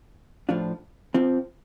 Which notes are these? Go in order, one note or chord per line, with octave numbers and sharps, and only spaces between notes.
A2 F3 D4 F4
F2 F3 C4